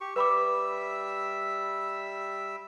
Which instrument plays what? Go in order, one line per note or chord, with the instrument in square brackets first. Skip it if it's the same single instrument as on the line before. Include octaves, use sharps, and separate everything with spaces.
[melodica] G4 C#6
[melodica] G3 E5 E6 [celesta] B4 B5 D6